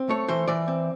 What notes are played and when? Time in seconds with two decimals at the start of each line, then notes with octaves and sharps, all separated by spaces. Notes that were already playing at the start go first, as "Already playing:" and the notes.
Already playing: C4
0.09 A3 C#5
0.28 E3 C5
0.48 E3 D5
0.68 C4